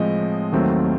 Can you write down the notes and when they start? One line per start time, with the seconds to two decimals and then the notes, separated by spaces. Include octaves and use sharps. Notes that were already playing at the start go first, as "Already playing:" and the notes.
Already playing: A2 F3 G#3 C4 D#5
0.52 D#2 D#3 F#3 A3 C4